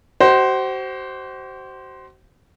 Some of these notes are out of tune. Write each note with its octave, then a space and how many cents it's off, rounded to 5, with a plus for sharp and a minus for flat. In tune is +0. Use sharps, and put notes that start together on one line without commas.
F#4 +40 C5 +0 D#5 +0